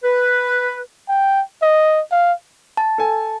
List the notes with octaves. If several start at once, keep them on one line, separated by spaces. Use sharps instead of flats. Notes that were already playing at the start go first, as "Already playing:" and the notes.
B4
G5
D#5
F5
A5
A4 G#5